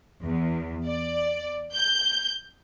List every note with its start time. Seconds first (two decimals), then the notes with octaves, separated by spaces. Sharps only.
0.24 E2
0.86 D5
1.75 G6